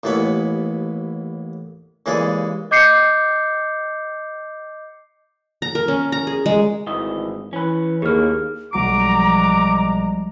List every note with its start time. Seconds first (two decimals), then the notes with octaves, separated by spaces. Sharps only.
0.03 A1 D#2 E3 B3 C#5 B5
2.06 D#2 C#3 E3 G#3 G#4 D5
2.71 D#5 D6 G6 C7 C#7
5.62 A#5
5.75 A#4
5.88 C#4
6.12 A#5
6.27 G#4
6.46 G#3
6.87 G#1 D2 E3 D#5
7.53 E3 C#4 B4
8.02 D#2 A2 A#3 G#4 F6
8.73 B1 F3 G3 G#3 F#4 A#5 D6 D7